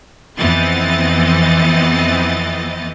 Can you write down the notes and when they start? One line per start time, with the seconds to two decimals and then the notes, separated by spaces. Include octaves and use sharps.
0.38 F2 E3 B3 C4 D#5 A6